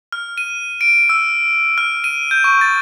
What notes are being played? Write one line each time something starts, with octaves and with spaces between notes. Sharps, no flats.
F6
D#7
D7
E6
F6
D#7
G6
C#6
A6